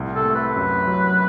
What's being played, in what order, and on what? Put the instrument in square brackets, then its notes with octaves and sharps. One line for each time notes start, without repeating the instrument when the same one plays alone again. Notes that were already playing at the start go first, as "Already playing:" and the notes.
Already playing: [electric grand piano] C2 A2
[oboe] A4
[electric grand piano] A3
[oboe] B4
[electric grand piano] F#2
F#3